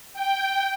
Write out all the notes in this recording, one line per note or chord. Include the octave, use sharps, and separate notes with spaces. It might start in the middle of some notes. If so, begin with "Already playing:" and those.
G5